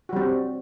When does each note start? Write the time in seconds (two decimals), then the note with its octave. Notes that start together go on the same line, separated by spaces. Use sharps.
0.09 F#4
0.13 G3
0.16 C4